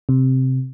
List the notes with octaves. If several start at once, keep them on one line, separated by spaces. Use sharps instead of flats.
C3